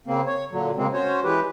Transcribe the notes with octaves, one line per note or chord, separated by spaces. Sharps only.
C#3 A#3 C4
C#5
A#2 D3 F#3
C#3 G#3 A#3 C4
C#4 F#4 C5 C#5
E3 G#3 G4 B4